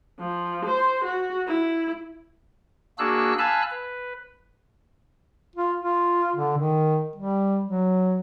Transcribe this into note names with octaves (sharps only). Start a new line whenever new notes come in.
F3
C5
F#4
E4
A#3 D4 F#4 G#4 E6 F#6
F5 G#5 A5 B5 E6 F#6
B4
F4
F4
D3
D#3
G3
F#3